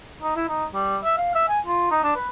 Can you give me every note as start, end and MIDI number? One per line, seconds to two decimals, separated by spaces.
0.22 0.36 63
0.36 0.45 64
0.49 0.65 63
0.74 0.98 55
1.04 1.14 76
1.18 1.31 77
1.35 1.45 76
1.48 1.59 80
1.66 1.87 65
1.91 2.01 63
2.03 2.12 62
2.16 2.28 71